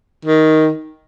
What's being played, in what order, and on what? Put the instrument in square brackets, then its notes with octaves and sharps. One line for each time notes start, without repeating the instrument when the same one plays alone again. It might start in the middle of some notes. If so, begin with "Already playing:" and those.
[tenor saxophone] D#3